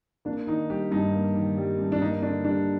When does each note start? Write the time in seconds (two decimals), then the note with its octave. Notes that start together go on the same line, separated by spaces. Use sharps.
0.25 A#3 D4
0.47 D#3 D#4
0.70 G3 G4
0.91 G2 D#4
1.13 A#3
1.36 D#3
1.58 G3
1.79 G2
1.92 D4
2.01 A#3 D#4
2.22 D3 D4
2.44 G3 D4